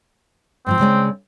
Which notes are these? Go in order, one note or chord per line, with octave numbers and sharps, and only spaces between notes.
G#2 E3 F3 C4
C#3 G#3 D5